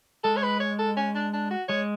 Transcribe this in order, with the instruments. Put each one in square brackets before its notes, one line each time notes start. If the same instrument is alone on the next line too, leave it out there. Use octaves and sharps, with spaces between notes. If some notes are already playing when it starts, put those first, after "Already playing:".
[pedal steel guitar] G#3 [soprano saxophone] A4
[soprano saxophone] C#5
B4
C#5
A4
C#4
D4
D4
F#4
[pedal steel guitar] G#3 [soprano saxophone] C#5